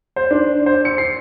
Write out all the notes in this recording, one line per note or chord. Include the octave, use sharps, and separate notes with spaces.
C5
D4
C5
C#7
C7